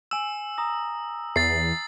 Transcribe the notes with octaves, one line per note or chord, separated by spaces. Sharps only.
G#5 E6 E7
A#5 D#6 A#6
E2 A6 C7